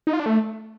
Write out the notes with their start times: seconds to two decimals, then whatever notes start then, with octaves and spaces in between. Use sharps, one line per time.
0.07 D#4
0.13 F4
0.20 D4
0.26 A3